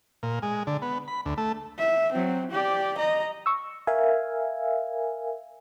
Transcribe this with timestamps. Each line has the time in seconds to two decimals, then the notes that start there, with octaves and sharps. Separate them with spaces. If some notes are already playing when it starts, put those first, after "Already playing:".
0.23 A#2
0.42 G#3
0.67 D3
0.82 B3
1.08 B5
1.26 D2
1.38 A3
1.79 E5
2.13 F#3 C4
2.51 G4 D5
2.98 D#5 A#5
3.46 C#6 E6
3.87 A#4 E5 F5 G#5